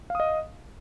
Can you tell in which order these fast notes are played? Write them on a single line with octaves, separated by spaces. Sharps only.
F5 D#6 D#5